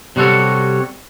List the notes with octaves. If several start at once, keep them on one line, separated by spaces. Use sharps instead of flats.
C3 G3 F#4 A4 C#5